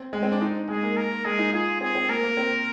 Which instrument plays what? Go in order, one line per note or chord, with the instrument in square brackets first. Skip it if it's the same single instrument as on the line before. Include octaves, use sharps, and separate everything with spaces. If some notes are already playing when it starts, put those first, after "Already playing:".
Already playing: [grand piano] C4
G#3
C4
D4
D#4
[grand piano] G#3 [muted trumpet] G#4
[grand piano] A#3
[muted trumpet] A#4
[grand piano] G#3 [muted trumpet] G#4
[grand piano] D#4
[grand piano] F4 [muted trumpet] G#4
[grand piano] C4 [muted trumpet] G#4
[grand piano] C4
[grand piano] A#3 [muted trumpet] A#4
[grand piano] A#3
C4